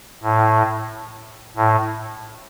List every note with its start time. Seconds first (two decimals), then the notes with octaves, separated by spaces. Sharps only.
0.23 A2
1.56 A2